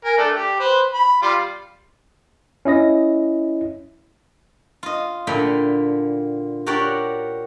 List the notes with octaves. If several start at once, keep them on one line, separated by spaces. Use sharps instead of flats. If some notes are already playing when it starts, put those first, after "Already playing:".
A#4 G#5
A3 D4
G4
B4 C5
B5
G3 F4
C#4 E4 D#5 A#6
F4 D#5
A#2 D3 E4 E5 G5 A#5
F#4 G4 A#4 C#5 D5 F#5